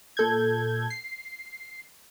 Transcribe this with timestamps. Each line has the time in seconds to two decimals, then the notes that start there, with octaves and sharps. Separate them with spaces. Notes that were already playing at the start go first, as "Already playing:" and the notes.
0.17 A#2 A4 G6 G#6
0.90 C7